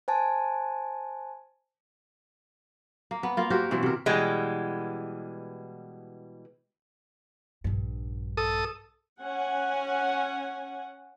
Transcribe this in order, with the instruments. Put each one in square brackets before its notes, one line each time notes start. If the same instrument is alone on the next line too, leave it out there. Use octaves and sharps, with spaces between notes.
[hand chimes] C5 G#5 A5
[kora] A#3
B3
A#3 F4
F#4 G4 A#4 C5
B2 E3 C4
C3 A#4
[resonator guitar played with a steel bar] B2 E3 G3 G#3
[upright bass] A#1 G2
[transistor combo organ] A4 D#6
[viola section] C#4 F#5 G#5